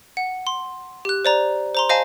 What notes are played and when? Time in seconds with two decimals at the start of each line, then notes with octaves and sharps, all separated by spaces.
0.17 F#5
0.47 C6
1.05 G4 F#6
1.25 C5 D5 A#5
1.75 C5 A#5 C6
1.89 C5 D#5 F5 G#5 A5